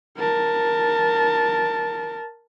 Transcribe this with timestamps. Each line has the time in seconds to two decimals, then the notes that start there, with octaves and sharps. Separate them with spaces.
0.18 A#4 A5